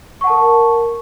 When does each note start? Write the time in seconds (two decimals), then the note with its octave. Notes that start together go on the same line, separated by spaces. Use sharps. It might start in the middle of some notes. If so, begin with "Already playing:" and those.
0.21 C#6
0.24 F#5
0.27 A5
0.30 A#4